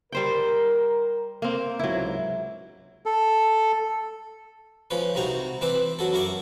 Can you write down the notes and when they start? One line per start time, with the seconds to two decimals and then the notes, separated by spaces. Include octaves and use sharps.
0.12 G3 A#4 C5 G5
1.42 A#3 C4
1.79 C#2 G#2 C3 F#3 E4
3.06 A4
4.91 F3 C#4 B4
5.15 C2 C3 D#4 F#4 A#5
5.61 E3 C4 B4 E5 D6
5.99 F#3 F#4 A4
6.13 F#2 E4 A#4 C#6 D6